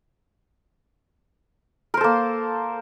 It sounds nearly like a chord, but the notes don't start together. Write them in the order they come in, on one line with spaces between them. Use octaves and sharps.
A#4 C5 A4 A#3